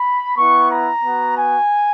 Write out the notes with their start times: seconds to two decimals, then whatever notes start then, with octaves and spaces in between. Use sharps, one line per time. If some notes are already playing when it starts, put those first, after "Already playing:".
Already playing: B5
0.36 B3 E4 C#6
0.69 A#5
1.03 B3 F#4
1.37 G#5